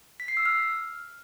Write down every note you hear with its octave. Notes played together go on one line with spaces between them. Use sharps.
B6
C7
E6
F6